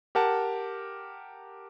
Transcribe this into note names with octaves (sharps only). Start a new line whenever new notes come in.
G4 A#4 F#5 A5